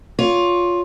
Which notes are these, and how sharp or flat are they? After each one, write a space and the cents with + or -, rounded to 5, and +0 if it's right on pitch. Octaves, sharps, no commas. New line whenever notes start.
F4 +10 C#5 +25